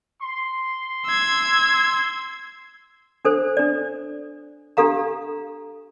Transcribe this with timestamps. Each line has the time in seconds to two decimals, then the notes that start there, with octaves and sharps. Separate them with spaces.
0.22 C6
1.06 E6 G#6
3.25 D4 A4 C5
3.57 D4 D5
4.77 D4 G4 A4 F5 A#5